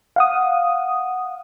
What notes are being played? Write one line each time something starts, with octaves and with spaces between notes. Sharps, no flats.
F5 F#5 D#6